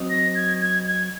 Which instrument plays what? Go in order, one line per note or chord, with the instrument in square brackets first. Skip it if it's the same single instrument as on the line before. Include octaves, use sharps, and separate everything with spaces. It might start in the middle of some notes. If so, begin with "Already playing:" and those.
Already playing: [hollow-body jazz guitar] F#3 C4 D#4
[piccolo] A#6
G#6
G#6
G#6